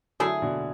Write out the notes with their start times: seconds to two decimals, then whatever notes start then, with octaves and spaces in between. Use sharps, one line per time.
0.20 D3 F#3 A3 E4 G#4
0.42 B2 D3